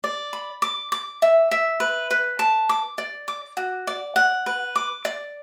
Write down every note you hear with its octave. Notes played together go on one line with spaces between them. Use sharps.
D5
B5
D6
D6
E5
E5
B4
B4
A5
D6
D5
D6
F#4
D5
F#5
B4
D6
D5